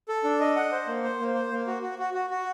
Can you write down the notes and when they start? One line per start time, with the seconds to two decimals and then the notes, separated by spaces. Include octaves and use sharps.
0.08 A4
0.24 D4
0.40 D#5
0.56 F#5
0.72 C5
0.87 A#3
1.04 C5
1.20 A#3
1.35 C5
1.52 A#3
1.67 F#4
1.83 F#4
1.99 F#4
2.14 F#4
2.30 F#4